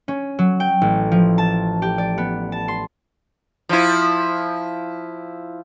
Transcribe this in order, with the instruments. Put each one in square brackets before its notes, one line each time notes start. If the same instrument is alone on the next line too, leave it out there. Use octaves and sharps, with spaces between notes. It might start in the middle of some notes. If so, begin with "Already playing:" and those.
[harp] C#4
F#3
G5
A1
F3
A5
G4
D5
B3
A5
C6
[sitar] F3 E4